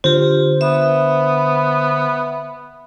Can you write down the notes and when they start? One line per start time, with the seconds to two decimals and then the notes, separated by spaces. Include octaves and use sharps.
0.04 D3 F4 G4 C5
0.61 B3 E5